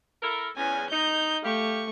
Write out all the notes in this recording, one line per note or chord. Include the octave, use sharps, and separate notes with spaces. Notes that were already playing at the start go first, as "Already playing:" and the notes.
E4 A4 A#4
E2 C#4 G#5
D#4 G6
A3 G4 F5 C#6